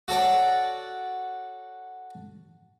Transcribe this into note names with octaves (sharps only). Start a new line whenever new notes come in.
F#4 A4 C#5 D5